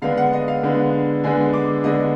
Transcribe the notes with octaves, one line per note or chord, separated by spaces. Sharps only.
D3 G#3 B3 D4 F5
F#5
D#5
F5
D3 G#3 B3 D4
D3 G#3 B3 D4 G#5
D6
D3 G#3 B3 D4 D#5